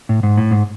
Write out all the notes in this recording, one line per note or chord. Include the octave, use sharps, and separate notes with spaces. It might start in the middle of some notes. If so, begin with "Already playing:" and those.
A2
G#2
A2
G#2